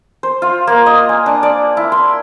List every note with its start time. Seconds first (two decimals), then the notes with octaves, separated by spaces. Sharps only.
0.23 C5
0.42 F4
0.67 A#3
0.86 D#5
1.09 G#5
1.26 D4
1.43 D5
1.77 E4
1.92 C6